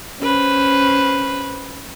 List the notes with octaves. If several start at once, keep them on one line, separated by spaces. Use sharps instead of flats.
C#4 B4 C5